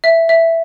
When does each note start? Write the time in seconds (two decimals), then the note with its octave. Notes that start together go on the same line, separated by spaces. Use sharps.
0.04 E5
0.29 E5